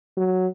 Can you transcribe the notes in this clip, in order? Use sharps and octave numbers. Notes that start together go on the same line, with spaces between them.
F#3